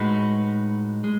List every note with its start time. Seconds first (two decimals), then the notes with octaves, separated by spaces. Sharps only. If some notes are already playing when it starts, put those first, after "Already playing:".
Already playing: A2 G#3 D#4 F#4 B4
1.04 G#3